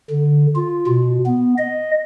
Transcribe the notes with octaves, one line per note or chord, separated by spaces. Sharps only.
D3
F4
B2
B3
D#5